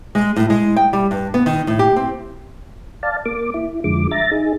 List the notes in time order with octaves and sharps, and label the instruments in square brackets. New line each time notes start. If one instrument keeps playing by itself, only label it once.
[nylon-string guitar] G#3
A2
G#3
G5
G3
G2
B3
D#3
A2
G4
C4
[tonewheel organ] D5 F5 A5
A#3 D6
E4
F2 D3 F3 G#3 D6
E5 A#5 A6
D#4 G#4